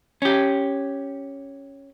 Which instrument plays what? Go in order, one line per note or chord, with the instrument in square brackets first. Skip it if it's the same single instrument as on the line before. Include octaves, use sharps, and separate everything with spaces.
[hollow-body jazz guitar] C#4 G4